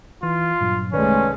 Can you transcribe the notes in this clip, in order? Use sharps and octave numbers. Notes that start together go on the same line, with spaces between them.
E3 F4
G2 A#2 F#3
C2 D#3 G#3 A3 C#4 B4 D5